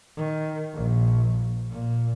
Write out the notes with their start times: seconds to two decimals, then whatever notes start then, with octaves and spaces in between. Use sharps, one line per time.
0.17 D#3
0.74 A#1
1.70 A#2